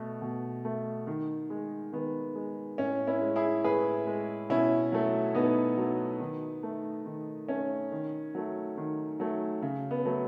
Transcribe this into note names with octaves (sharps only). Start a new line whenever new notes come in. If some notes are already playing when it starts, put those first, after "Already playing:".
Already playing: B2 A3
B2
A3
D#3
G#3
D#3 B3
G#3
A2 C#4
C#4 E4
G#3
E4 G#4
A2 G#4 B4
G#3
B2 C#4 E4
F#3 A3
B2 B3 D#4
F#3 A3
D#3
A3
D#3
A3 C#4
D#3
F#3 A3
D#3
F#3 A3
C#3
B3
F#3 A3